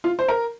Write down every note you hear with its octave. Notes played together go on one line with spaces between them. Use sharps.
F4
C5
A#4